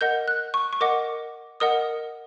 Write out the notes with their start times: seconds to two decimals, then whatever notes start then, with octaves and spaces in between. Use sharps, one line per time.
0.01 A#4 D#5 F#5 G6
0.28 F#6
0.54 C#6
0.73 C#6
0.81 A#4 D#5 F#5 D6
1.60 A#4 D#5 F#5 D#6